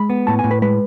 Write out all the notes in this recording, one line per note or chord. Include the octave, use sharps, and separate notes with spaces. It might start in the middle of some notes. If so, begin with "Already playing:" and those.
Already playing: G#3 B5
B3
A2 A5
G#5
A2
B4
G#3 B4